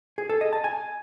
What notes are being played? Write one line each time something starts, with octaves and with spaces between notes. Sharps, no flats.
G#4
A4
D#5
A5
G#5